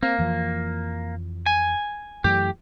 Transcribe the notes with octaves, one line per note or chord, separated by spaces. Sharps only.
A#3 C4
F2 E3 F3
G#5
F#2 E3 A3 G4